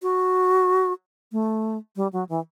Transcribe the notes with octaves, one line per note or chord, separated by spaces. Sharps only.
F#4
A3
G3
F#3
E3